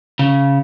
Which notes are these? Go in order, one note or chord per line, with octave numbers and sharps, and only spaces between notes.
C#3